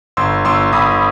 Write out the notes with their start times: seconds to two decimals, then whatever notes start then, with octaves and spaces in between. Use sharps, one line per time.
0.17 G1 C6 E6
0.45 G1 C6 E6
0.73 G1 B5 D#6